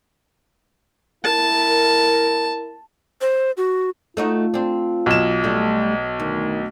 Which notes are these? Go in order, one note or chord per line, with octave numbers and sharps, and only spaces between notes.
E4 A#4 A5
C5
F#4
A3 D#4 F4 F#4
C4 D4
B1 E7
G3 A3 D4
D2 D#3